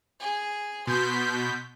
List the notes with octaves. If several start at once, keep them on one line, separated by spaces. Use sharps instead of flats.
G#4
B2 C6 G6 B6